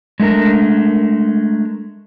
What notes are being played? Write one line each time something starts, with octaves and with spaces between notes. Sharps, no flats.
G#3 A3 D4 A#4